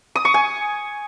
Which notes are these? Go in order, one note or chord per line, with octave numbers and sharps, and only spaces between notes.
D#6
C#6
G#5